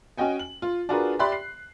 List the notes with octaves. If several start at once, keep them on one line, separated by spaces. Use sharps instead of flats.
C#4 F#4 D#5 G5 G#5
F#7
F4
D4 F4 F#4 G#4 A#4 B4
G4 D5 E5 B5 C6 F#6
C7